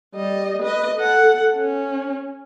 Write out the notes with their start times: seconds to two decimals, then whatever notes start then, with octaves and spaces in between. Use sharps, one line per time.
0.15 G3 D#5
0.62 B4 D#5
0.97 A4 F#5
1.56 C#4